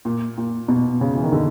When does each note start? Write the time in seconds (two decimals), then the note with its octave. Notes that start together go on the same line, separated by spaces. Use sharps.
0.05 A#2
0.38 A#2
0.68 B2
1.01 C#3
1.15 E3
1.23 D#3
1.32 D3